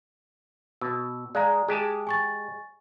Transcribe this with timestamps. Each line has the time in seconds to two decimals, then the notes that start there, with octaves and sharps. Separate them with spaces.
0.81 B2 E6
1.35 G#3 D5 F5 A#5
1.68 G#3 G4 G#4 A5
2.07 G#5 C#6 A6